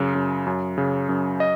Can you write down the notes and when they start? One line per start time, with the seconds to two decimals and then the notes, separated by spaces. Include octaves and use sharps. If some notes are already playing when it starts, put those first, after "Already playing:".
Already playing: F#2 C#3
0.15 F#2
0.46 F#2
0.78 C#3
1.09 F#2
1.40 D#5